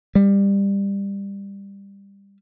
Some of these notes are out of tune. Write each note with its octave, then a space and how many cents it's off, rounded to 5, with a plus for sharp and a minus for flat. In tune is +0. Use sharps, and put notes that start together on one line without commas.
G3 +20